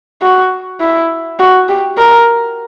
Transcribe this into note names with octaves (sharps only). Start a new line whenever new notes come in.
F#4
E4
F#4
G4
A#4